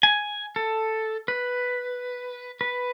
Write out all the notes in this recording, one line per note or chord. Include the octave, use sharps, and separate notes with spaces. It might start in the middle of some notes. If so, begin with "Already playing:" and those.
G#5
A4
B4
B4